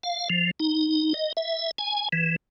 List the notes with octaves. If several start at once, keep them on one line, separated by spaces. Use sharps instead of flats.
F5
F3
D#4
D#5
E5
G#5
E3